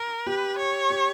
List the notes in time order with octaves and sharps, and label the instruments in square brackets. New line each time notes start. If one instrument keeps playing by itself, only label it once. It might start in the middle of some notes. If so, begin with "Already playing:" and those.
Already playing: [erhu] A#4
[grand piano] G4 [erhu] B4
[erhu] C#5
[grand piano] G4